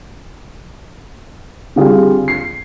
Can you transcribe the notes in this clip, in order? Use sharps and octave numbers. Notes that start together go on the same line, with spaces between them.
D3 G3 C4 F4 G#4
C7